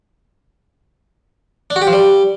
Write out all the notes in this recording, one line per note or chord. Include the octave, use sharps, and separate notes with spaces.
D4
F#4
G4
F3
G3